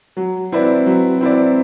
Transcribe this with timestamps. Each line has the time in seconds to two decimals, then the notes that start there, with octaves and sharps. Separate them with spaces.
0.17 F#3
0.52 C4 E4 B4 D5
0.86 F#3
1.21 C4 E4 B4 D5